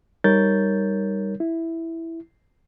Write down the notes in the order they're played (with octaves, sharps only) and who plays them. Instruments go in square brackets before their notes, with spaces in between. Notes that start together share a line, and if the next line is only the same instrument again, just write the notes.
[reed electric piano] G3 D#4 A#4 C#5 G6 A6
E4